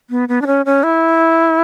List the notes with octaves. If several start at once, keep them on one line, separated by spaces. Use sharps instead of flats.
B3
B3
D4
C#4
C#4
E4